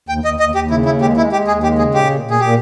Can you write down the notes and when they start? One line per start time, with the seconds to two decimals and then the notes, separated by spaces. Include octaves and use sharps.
0.09 D#2 G5
0.24 D#2 D#5
0.39 D#2 D#5
0.55 D#2 G4
0.70 C#3 E4
0.85 D#2 E4
1.01 G#3 G4
1.16 G#3 E4
1.32 G#3 G4
1.47 D#2 G#4
1.62 G#3 G4
1.78 C#3 G#4
1.94 A#2 G4
2.09 A#2
2.25 A#2
2.30 G#4
2.40 A#2 G4